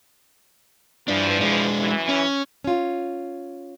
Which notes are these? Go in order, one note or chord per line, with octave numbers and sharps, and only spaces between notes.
G2 E3 F3 D4
G#3 D4
F#2 E3
C#4
C#4 F4